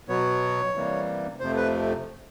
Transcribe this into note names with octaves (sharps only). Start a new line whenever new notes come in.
B2 F#3 B3 C#5
C3 E3 G3 A#3
F2 C3 F3 A3 C5
B4